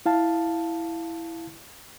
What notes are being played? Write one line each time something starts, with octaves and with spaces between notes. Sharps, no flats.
E4 F5 A5